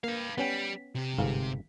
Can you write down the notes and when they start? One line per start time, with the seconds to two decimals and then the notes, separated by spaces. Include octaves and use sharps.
0.04 A#3 B4 F5
0.38 G3 B3 C#4 G5
0.95 C3 G4
1.18 G1 G#2 F5